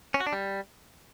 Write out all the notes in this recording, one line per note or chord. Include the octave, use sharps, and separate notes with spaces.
C#4
F#4
D4
G3